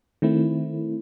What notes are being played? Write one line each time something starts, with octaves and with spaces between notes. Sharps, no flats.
D#3 A3 C4 E4